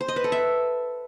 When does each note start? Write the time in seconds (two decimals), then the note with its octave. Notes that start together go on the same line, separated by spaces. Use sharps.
0.01 C5
0.08 D#5
0.16 B4
0.24 A4
0.32 E5